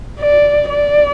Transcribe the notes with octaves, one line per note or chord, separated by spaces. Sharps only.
D5
D5